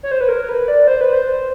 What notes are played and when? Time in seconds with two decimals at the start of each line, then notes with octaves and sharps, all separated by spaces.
0.03 C#5
0.11 C5
0.21 B4
0.28 A#4
0.49 B4
0.68 D5
0.87 C5
1.01 B4
1.13 C5